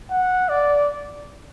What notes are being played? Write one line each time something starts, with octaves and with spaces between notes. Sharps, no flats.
F#5
D5